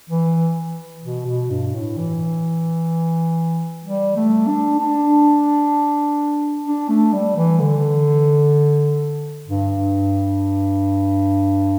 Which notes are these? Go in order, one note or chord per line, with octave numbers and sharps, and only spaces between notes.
E3
B2
B2
G2
A2
E3
G3
A3
D4
D4
D4
A3
G3
E3
D3
G2